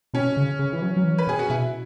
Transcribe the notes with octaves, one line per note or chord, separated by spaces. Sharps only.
B2 C#4
C#3
C#3
E3
F#3
F#3
E3
B4
B2 G#4
F#4
B2 E4